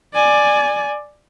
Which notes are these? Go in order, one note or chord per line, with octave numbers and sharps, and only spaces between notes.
D5 G#5